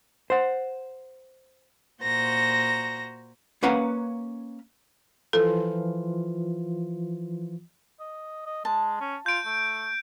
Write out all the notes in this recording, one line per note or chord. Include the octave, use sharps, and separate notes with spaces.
C5 F#5
A#2 F#4 C5 A#5 A#6
A#3 C#4 B4 F5 F#5 A#5
E3 F3 F4 A4
D#5
D#5
G#3 A5
C#4
F4 G6 D7
A3